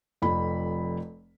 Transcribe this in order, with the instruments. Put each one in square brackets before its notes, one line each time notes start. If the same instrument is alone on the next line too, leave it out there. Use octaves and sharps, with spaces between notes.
[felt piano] F1 F2 B5